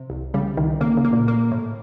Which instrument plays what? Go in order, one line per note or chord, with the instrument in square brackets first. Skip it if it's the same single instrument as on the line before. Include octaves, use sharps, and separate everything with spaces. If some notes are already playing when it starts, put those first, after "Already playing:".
Already playing: [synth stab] C3
C2
[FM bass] C#3 [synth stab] G3
[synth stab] C2 [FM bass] D#3
[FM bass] C#3 [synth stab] A#3
[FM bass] C#3
[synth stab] A#3
[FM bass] A#2
[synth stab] A#3
A2